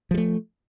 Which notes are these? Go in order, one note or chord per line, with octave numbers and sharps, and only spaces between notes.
F3 G3 A3